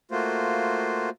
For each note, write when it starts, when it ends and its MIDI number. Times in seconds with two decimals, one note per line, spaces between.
0.11 1.09 57
0.11 1.09 58
0.11 1.09 65
0.11 1.09 66
0.11 1.09 72